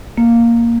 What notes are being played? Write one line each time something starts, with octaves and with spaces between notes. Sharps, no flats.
A#3